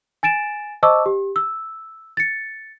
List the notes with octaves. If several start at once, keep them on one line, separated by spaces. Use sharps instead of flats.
G#5 A6 D7 E7
C5 D#5 A5 C#6 D6 E6
G4
E6
A6 C#7